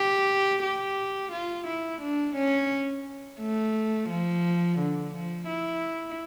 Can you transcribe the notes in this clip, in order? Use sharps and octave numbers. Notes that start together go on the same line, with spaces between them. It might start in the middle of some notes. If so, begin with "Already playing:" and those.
Already playing: G4
G4
F4
E4
D4
C#4
A3
F3
D3
F3
E4